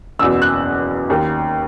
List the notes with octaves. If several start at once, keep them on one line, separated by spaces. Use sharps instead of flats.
F#1 E2 B2 E6
F#6
D#2 D#3